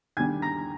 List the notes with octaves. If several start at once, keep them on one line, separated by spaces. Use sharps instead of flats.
D#2 D3 G3 D4 G#5 G#6
A#5 A#6